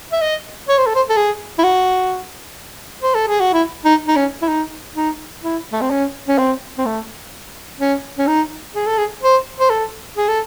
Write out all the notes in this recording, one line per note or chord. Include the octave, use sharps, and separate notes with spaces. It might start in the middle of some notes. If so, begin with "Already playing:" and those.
E5
D#5
C#5
C5
A4
C5
A4
G#4
E4
F#4
C5
A4
G#4
F#4
E4
D#4
D#4
C#4
E4
D#4
D#4
E4
A3
C4
C#4
C#4
C4
C4
A3
C#4
C#4
D#4
G#4
A4
G#4
C5
C5
A4
G#4
A4